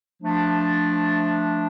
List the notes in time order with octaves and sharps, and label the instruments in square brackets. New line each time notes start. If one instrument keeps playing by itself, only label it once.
[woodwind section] F3 A3 D4